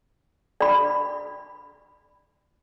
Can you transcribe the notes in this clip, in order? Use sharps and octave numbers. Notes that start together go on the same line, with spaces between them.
D5 B5